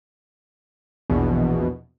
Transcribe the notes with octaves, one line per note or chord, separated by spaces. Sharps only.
A#1 E2 B2